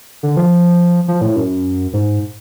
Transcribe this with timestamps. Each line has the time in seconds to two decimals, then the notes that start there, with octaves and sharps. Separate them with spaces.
0.23 D3
0.37 F3
1.08 F3
1.21 A2
1.36 F#2
1.93 G#2